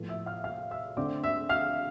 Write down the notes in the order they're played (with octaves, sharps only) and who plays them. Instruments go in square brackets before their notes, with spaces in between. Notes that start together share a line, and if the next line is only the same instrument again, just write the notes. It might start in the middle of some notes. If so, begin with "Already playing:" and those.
Already playing: [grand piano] A2 F3 B3
E5 E6
F5 F6
F5 F6
E5 E6
D3 A3 C4 D5 D6
E5 E6
F5 F6